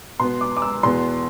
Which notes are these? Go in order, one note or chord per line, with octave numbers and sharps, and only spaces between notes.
B2 B3 C6
D6
D6
E6
E2 B2 B3 C6